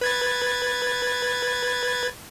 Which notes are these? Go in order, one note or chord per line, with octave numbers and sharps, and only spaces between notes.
B4 G#6 A6